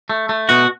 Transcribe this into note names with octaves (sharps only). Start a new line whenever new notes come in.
A3
A3
B2 F#4